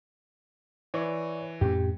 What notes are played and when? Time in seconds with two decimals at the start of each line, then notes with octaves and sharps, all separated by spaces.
0.94 E3 C#5 D5 C#6
1.61 F2 A2 C#4 G4